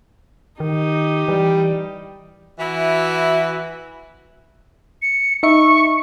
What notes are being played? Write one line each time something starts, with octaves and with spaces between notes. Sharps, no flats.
D#3 D#4 G4
E3 G3
E3 E4 F#4 B4
C#7
D#4 E5 C#6 C#7